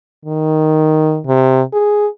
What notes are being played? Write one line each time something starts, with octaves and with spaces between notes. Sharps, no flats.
D#3
C3
G#4